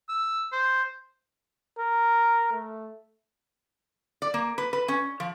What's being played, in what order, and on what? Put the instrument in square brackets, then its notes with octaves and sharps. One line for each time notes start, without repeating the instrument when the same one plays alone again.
[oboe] E6
C5
[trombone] A#4
A3
[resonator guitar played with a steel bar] D5
A#3
B4
B4
C#4
F3